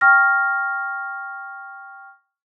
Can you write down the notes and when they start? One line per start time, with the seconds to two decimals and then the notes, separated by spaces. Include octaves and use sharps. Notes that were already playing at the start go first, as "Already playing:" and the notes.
0.01 G5 C#6 F6 A#6